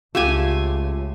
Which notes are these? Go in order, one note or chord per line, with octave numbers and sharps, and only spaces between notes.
C#2 A3 F4 G4 G#5